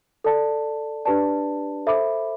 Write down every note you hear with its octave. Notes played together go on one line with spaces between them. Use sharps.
A4 D5 A5
D4 G4 B4 D5 A5
A4 C5 E5 B5 D6